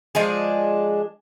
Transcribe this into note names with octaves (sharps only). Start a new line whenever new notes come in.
F3 G#3 D4 G#4